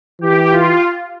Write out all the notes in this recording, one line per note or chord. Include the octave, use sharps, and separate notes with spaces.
E3 G4
F4